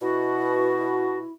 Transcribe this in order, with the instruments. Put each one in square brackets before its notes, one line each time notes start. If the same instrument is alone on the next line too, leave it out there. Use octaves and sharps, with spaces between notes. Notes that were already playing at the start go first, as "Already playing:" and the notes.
[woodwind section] B2 [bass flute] E4 [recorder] F#4